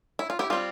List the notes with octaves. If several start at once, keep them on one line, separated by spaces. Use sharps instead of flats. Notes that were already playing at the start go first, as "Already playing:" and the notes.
E4
F4
E4 G4
G3 C4 F4